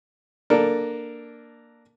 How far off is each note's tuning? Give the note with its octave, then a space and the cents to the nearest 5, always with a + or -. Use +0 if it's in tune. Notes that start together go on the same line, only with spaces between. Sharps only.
A#3 +0 D4 +10 A4 +5